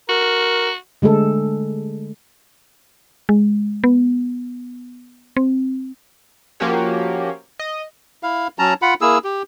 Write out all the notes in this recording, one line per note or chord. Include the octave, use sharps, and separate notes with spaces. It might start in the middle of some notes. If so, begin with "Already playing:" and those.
F#4 A#4
D3 G#3 A3 A4
G#3
B3
C4
F3 A#3 C#4 F#4 G4 C#5
D#5
E4 F5
F#3 C#4 A5 A#5
F4 F#5 B5
A#3 E4 G#4 E6
G4